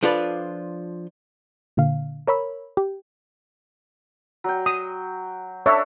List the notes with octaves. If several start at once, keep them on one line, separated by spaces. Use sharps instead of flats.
F3 D4 F4 A4 B4 D5
A#2 D3 F5
A#4 C#5 B5 E6
G4
F#3 G5
D#6
D4 A4 C#5 E5